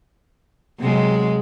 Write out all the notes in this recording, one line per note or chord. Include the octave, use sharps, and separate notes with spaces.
C3 F#3 G#3